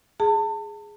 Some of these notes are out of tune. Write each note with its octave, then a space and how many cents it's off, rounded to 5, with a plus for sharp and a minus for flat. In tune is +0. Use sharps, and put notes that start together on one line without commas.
G#4 +0 A5 +30